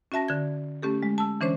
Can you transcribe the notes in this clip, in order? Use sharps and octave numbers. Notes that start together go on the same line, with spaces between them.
C#4 F#4 E5 A5 A#6
D3 G#6
A3 C#4 G4 A4
G#3
A5 E6
D3 E3 C#4 D4 C5 C#5